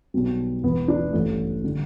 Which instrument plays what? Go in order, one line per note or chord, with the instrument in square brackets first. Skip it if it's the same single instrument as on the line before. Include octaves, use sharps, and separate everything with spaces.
[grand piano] B1 B2 G3
E1 E2 E3 B3
D4
A1 G2 E3 A3
D3 G3